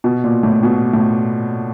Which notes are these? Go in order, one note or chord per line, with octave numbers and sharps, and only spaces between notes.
B2
A#2
A2
B2
A2